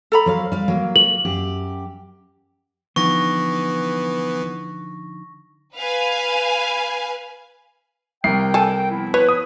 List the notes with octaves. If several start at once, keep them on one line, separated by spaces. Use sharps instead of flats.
A4 A#5 B5
F#3 C5 F5
G3 F5
F#3 A#3
F#7
F#2 G4
D3 E3 F3 B3 D#4 C#6 A#6
B4 F5 G#5
C2 A#4 G5 C7
A4 G#5
F3 B3 E4
B4 C#5
D#6